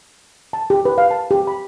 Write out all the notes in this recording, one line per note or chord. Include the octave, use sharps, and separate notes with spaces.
A5
G4
B4
F5
A5
G4
B5